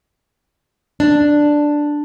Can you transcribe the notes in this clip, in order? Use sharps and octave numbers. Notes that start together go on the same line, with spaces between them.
D4